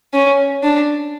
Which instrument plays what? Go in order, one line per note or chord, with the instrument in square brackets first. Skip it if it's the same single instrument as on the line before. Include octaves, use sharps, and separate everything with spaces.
[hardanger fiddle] C#4
D4